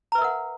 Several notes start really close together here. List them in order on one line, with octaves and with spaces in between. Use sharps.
A#5 B4 E5 A#4 F#5